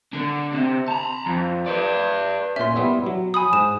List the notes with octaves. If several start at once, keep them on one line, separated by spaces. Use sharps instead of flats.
D3 D4
C3 C4
A5 A#5
F2
B4 D5
A#2 C#4 E5 C6
G3 B3 E4
F#3
G#5 B5 D#6
G#2 E7